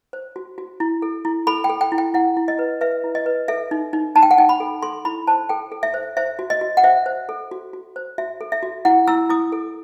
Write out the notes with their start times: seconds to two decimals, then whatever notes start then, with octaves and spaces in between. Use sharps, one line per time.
0.13 C5
0.36 F#4
0.58 F#4
0.80 E4
1.02 A4
1.25 E4
1.47 A4 B5
1.64 G5
1.70 A4
1.81 G5
1.92 E4
1.98 G5
2.14 E4 F#5
2.37 E4
2.48 D#5
2.59 B4
2.81 B4 E5
3.04 E4
3.15 D#5
3.26 B4
3.48 A4 E5
3.71 D#4
3.93 D#4
4.15 D#4 A5
4.23 G5
4.31 F#5
4.38 D#4 G5
4.49 B5
4.60 A4
4.82 A4 C6
5.05 E4 B5
5.27 C5 A5
5.49 A4 G5
5.72 A4
5.83 E5
5.94 C5
6.17 C5 E5
6.39 F#4
6.50 D#5
6.61 F#4
6.77 F#5
6.84 C5 E5
7.06 C5
7.29 A4
7.51 F#4
7.73 F#4
7.96 C5
8.18 F#4 E5
8.41 A4
8.52 E5
8.63 F#4
8.85 E4 F#5
9.08 E4 E6
9.29 E4 D#6
9.52 A4